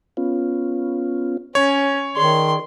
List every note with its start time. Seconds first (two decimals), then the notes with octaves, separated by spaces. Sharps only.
0.17 B3 C#4 F4
1.55 C#4 C#5
2.16 D#3 G#4 D5 C6